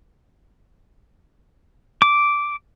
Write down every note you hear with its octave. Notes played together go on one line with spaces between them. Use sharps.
D6